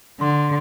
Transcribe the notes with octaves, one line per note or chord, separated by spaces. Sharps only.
D3 C6